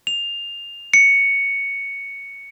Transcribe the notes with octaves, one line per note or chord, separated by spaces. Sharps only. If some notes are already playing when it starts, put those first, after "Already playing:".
F7
C#7